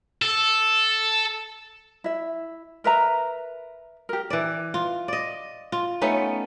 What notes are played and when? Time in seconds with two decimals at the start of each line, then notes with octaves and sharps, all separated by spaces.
0.22 A4
2.04 E4 E5
2.84 A#4 B4 E5 A#5
4.09 G4 A#4
4.30 E3 D5
4.74 F4
5.08 D5 D#5
5.72 F4
6.01 A3 B3 C#4 D#4